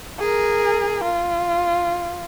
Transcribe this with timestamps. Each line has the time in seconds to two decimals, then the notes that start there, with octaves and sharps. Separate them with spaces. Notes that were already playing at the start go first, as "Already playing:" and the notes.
0.19 G#4 A#4
1.04 F4